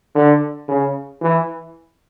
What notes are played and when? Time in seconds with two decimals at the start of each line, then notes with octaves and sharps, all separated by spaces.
0.15 D3
0.68 C#3
1.22 E3